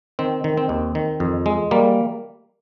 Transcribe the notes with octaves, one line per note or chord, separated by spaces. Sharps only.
D#3 C4
D#3
C4
D#2
D#3
F2
G#3
G3 A#3